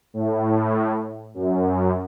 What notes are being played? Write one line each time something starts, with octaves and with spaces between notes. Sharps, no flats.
A2
F#2